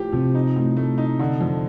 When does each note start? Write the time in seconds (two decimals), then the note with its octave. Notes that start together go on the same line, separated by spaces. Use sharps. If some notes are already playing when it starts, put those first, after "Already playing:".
Already playing: A2 F3 G4
0.13 C3 F3
0.35 D#4
0.56 A2
0.77 A3
0.98 D#4
1.19 D3
1.41 F2